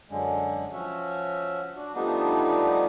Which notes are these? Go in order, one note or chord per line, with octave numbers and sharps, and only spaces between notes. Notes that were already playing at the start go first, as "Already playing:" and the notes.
F#2 D3 G#3
F3 C#4 F#4 E5
D4 F#4
F3 G3 A3 B3 D4 D#4